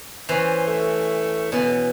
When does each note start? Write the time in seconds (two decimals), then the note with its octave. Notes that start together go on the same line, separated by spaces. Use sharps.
0.29 E3 C#4 C5
0.67 A3
1.52 B2 E3 C#4